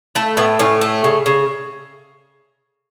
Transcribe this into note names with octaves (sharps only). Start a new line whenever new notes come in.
A3 E4
A2 B3
A2 C#4
A3
C#3
C#3